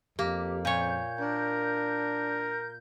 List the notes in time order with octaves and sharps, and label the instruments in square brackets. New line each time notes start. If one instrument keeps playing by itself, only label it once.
[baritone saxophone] F2 [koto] A#3 [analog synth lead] G4
[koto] A#2 C#5 [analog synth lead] G6
[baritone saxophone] D4 [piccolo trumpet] A#4